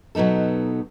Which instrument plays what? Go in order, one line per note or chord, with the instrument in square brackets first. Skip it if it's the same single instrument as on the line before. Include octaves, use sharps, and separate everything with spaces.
[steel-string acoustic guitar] B2 F#3 B3 D#4 A4